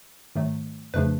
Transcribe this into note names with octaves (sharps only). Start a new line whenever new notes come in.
G#2 D#3 F#3 A3
F2 C#3 F3 A3 D4 B4